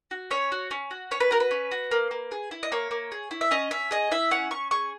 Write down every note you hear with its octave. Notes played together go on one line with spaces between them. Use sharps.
F#4
C#4 C#5
F#4
C#4
F#4
C#4 C#5
B4
F#4 A#4
B4
C#4
F#4
A#3
A#3
G#4
E4
D#5
A#3 C#5
A#3
G#4
E4
E5
C#4 D#5
C#4 E5
G#4 D#5
E4 E5
C#4 F#5
C#4 C#6
G#4 C#6